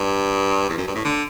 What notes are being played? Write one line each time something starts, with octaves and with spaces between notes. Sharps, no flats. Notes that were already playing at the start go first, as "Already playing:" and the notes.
Already playing: G2
E2
F#2
G2
A2
D3